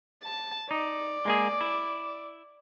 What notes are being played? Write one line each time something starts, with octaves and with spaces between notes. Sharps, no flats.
A5
D#4 D5
G#3 A#3 G#4
E4